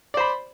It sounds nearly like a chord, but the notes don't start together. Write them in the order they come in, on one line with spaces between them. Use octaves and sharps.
D5 C5 B5